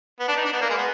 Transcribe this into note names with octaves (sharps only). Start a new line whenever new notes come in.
B3
D4
D#4
D4
B3
A#3
G#3
B3